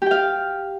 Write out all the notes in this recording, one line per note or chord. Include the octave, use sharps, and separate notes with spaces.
G4 F5 G5